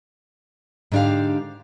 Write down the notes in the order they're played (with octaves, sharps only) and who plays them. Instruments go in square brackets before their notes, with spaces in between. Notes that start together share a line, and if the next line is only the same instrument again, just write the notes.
[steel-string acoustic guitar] G#2 D3 D4 G4 F5